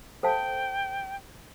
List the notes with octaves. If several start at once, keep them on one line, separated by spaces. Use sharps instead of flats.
A4 C5 F5 G5 A5